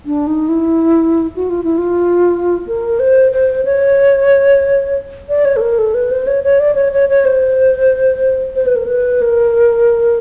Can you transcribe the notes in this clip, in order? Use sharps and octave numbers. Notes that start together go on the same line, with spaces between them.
D4
D#4
E4
F#4
F4
E4
F4
A#4
C5
C5
C#5
D5
C#5
A4
A#4
A4
B4
C5
C#5
C#5
D5
C#5
C#5
C#5
C5
C5
B4
A#4
B4
A#4